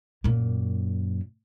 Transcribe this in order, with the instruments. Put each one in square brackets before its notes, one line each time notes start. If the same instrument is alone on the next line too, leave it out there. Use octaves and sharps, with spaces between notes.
[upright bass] F#2 A#2